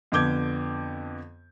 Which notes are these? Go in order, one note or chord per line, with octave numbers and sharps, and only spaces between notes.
F2 D3 B3 D6 G6 G#6